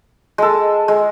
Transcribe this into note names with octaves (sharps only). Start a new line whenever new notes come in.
G#3 A4
G#3